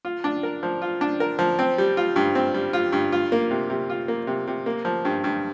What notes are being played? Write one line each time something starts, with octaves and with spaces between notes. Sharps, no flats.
F4
D4
A#4
F3
F4
D4
A#4
F3
C4
G3
F4
G2
C4
G3
F4
G2
F4
A#3
C3
C3
F4
A#3
C3
C3
A#3
F3
G2
G2